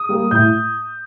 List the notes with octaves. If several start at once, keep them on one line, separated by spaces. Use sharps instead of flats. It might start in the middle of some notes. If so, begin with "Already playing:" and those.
Already playing: D#6
G3 A#3
A2 G6